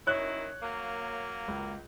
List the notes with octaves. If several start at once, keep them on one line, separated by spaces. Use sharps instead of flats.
F#2 D#3 E4 C#5 F#6
F#3 A#3
C#2